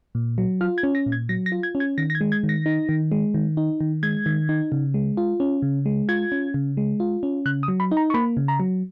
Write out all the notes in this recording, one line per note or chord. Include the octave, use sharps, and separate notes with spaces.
A#2
F#3
F4 F6
G#6
C#4
A#6
A#2
G#6
F#3 A#6
A#6
F4
G#6
C#4
G#6
D#3 A#6
A#6
G#6
G#3
G#6
D#3
A#6
D#4
D#3
G#3
D#3
D#4
D#3
G#3 G#6
D#3
D#4
C#3
G#3
F4
C#4
C#3
G#3
F4 G#6
C#4
C#3
G#3
F4
C#4
C#3 F#6
D#6
F#3
B5
D#4
A#5
C#6
A#3 B5
C#3
A#5
F#3